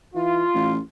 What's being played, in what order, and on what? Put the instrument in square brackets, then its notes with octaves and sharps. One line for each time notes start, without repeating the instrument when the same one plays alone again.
[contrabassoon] E3 [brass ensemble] F4
[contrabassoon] A1